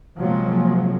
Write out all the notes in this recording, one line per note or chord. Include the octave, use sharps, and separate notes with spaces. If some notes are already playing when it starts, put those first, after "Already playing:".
C3 F3 F#3 G#3 A#3